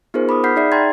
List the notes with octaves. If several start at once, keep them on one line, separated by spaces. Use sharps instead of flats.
B3 D#4 F4 G#4 A#4 C5
B5 D6 D#6
F#5 B5 F6 G6 B6 C7
D#4 G#4 D5 E5 C7
D5 G5 A#5 C6 G#6 A6